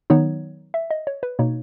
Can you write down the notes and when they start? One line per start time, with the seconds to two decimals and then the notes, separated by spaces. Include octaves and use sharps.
0.10 D#3 F#3 B3 D#4 C#5
0.74 E5
0.91 D#5
1.07 C#5
1.23 B4
1.39 B2 A#3 D#4 C#5